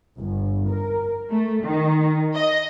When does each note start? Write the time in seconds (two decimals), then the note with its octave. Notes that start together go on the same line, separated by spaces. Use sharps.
0.17 G1
0.68 A#4
1.31 A3
1.64 D#3
2.34 D#5